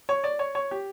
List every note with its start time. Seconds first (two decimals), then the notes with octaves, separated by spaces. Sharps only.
0.09 C#5
0.24 D5
0.39 C#5
0.55 C#5
0.71 G4